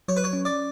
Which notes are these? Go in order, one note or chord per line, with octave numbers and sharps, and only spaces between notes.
F#3 C#5
B4
C#5
C#4
D5